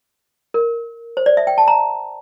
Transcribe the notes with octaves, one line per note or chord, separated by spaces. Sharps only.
A#4
C5
D5
E5
G5
A5
A#5